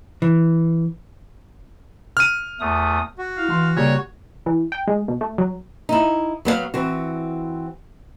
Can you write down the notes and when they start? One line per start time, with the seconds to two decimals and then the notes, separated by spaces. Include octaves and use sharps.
0.22 E3
2.17 F6 D#7
2.60 E2 A3 D#6
3.18 F#4
3.38 E4 F5
3.50 E3 C6
3.76 A#2 C#3 G3 C#5
4.46 E3
4.72 G5
4.88 G#3
5.08 B2
5.21 A3
5.38 F#3
5.89 D#4 E4
6.45 F#3 B3 B4 F5
6.74 E3 C4 F#4